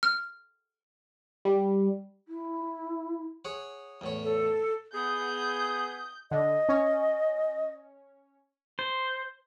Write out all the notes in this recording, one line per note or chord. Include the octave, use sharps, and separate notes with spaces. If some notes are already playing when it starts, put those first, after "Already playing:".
F6
G3
E4
G#4 C#5 F#5
E2 A2 C#5
A4
B3 G#4 D#6 G6
D3 D#5
C#4 C#5
C5